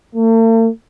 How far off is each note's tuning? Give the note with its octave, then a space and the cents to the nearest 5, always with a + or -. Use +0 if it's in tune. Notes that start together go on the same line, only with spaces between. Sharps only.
A3 +45